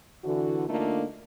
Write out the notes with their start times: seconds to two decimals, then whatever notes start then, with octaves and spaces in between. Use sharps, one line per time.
0.24 D3 E3 F#4
0.68 D3 A3 A#3 D4 D#4 F4